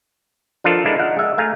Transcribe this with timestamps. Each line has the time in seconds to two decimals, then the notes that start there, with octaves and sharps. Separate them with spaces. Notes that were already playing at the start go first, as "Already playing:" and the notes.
0.64 F3 D4 F4 A4 A#4
0.86 G#3 D4 E4 A4 A#4
0.99 D#4 F5 F#5
1.16 G#3 E5
1.38 A3 F5 G#5 A#5